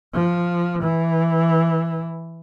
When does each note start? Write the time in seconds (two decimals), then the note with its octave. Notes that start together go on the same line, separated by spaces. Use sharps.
0.14 F3
0.81 E3